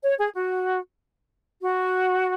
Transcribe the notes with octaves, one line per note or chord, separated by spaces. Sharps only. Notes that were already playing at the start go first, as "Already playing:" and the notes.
C#5
G#4
F#4
F#4